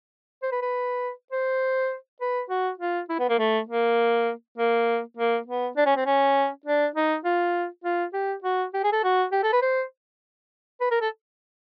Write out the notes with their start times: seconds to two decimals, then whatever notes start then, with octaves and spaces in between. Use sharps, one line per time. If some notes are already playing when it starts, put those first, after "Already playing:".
0.43 C5
0.52 B4
0.62 B4
1.32 C5
2.21 B4
2.50 F#4
2.79 F4
3.10 E4
3.19 B3
3.30 A#3
3.39 A3
3.69 A#3
4.58 A#3
5.17 A#3
5.48 B3
5.77 D4
5.86 C#4
5.97 C4
6.06 C#4
6.66 D4
6.96 D#4
7.25 F4
7.84 F4
8.14 G4
8.44 F#4
8.74 G4
8.84 G#4
8.93 A4
9.04 F#4
9.32 G4
9.43 A4
9.53 B4
9.62 C5
10.81 B4
10.91 A#4
11.01 A4